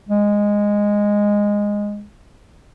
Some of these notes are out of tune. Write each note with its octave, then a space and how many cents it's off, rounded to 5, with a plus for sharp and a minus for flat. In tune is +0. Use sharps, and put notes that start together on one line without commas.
G#3 -10